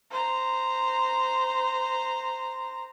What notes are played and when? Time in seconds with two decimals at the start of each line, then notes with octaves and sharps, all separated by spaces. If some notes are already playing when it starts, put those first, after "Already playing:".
0.10 C5 A#5